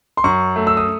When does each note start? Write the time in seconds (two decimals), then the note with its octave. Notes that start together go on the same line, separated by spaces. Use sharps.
0.17 C6
0.24 F#2 C#6
0.56 A3
0.67 E6
0.77 D#6